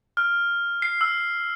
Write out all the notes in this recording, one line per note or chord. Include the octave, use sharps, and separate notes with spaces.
F6
C7
E6